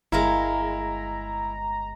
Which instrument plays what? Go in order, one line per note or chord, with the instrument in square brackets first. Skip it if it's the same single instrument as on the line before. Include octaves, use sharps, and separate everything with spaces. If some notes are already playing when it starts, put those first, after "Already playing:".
[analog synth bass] G1 [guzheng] G#3 A#4 F5 [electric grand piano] E4 [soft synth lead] A#5